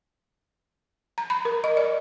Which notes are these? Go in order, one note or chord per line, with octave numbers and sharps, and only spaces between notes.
A#5
B5
A#4
D#5
D5